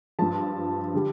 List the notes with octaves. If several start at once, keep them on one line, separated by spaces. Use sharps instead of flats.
G2 F3 A5
D3 G3